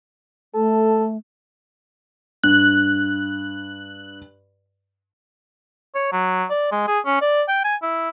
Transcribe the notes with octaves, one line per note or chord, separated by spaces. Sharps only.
A3 A4
G2 F#6
C#5
F#3
D5
G#3
G#4
C#4
D5
G5
G#5
E4